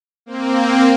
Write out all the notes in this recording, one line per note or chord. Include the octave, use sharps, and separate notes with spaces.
A#3 C4